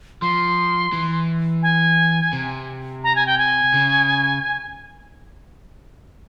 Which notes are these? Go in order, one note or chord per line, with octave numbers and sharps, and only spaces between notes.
F3 C6
E3
G#5
C3
A#5
G#5
G5
G#5
C#3